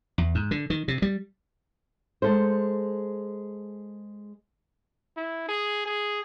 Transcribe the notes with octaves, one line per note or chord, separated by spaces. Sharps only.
E2
G#2
D3
D#3
C3
G3
G#3 A4 C5
E4
G#4
G#4